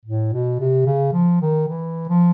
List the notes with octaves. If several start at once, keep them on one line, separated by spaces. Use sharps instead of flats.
A2
B2
C3
C#3
F3
D#3
E3
F3